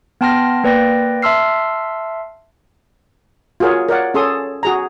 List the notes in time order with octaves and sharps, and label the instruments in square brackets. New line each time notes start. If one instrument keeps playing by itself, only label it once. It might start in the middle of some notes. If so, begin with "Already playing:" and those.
[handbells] B3 G5 A5 C6 F6 A#6
A#3 B4 D5 G5 A#6
E5 A5 C6 E6 F6 C7
[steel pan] F4 F#4 G#4 A#4 C#5
A#4 C#5 D5 F5 F#5
C#4 G#4 A4 C6 D#6
F#4 G#4 A#5